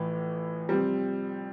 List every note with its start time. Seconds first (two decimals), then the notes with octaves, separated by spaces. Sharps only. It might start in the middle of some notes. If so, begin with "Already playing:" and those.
Already playing: A1 A2 E3 F3
0.69 C3 F3 G3 C4